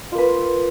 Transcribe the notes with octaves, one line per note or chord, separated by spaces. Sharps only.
A#3 F4 B4